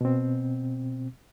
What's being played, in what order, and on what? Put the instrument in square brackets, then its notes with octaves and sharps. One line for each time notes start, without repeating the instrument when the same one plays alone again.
[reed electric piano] B2 C4